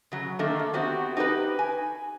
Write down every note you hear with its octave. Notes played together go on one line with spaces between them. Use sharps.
C#3 F#3
D#3 A3 A#3 D4
A3
B3 C4 F#4 G4
D#4 G4 G#4 B4
G#5